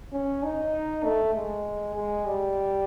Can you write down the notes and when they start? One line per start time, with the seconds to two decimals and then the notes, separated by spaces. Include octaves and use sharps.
0.12 C#4
0.44 D#4
1.04 A3
1.35 G#3
1.95 G#3
2.26 G3